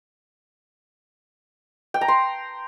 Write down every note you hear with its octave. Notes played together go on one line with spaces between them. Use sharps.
G5
A#5
C6